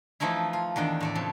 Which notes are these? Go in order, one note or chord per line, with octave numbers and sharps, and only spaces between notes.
E3 F3 A3 D#4 E4
F4
E2 D#3 D4 G5
A2 A3 D5
F2 C#3 C4